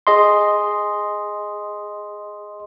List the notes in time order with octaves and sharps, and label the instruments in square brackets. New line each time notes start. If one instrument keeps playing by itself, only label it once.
[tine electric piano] G#4 D#5 C6